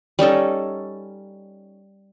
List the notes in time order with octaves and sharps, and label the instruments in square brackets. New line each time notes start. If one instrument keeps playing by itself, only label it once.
[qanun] G3 C#4 D#4 A4